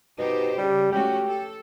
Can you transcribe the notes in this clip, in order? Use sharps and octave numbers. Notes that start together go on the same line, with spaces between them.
B2 D#4 G4 C5
C#3 G3
A3 C#4 F#4 G4
A4